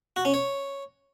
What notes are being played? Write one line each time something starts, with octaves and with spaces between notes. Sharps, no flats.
F#4
C#4
C#5